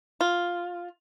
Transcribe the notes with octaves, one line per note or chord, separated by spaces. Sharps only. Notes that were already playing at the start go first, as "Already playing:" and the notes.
F4